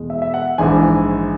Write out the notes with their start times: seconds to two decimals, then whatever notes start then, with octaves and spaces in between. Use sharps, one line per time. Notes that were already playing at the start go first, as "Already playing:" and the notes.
Already playing: E2 B2 G#3
0.10 E5
0.22 E5
0.34 F#5
0.58 A#1 G#2 E3 G#5